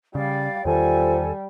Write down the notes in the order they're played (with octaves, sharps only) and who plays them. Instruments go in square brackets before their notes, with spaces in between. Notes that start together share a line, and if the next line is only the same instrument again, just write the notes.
[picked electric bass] C#3 [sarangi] G3 [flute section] D5 F5
[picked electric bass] E2 D#3 [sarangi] G3 [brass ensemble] F4 C5 [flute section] A4 G#5